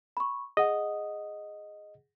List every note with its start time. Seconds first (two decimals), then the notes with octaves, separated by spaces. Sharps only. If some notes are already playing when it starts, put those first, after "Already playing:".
0.17 B5 C#6
0.57 G#4 D#5 F#5